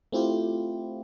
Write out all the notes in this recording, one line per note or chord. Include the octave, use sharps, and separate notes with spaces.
A3 C4 E4 F4 G4